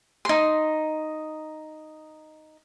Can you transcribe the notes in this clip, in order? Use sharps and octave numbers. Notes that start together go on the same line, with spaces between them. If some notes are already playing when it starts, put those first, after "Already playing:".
D#4 C6